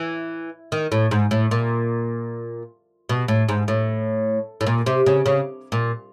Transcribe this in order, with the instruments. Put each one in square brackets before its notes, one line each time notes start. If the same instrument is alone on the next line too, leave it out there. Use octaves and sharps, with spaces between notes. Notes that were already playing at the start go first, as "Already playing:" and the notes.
Already playing: [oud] E3
D#3
A2
G#2
A2
A#2
B2
A2
G#2
A2
A2
A#2
C3
C#3
C#3
A#2